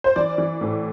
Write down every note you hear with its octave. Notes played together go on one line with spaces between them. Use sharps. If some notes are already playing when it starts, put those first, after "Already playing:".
C5
E3 D5
E3
A2